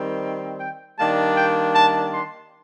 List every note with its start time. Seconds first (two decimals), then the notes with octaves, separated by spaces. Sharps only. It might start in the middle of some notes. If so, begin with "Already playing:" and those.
Already playing: D#3 G3 C4
0.59 G5
0.98 D#3 G3 A#3 D4 A5
1.36 G5
1.75 A5
2.12 C6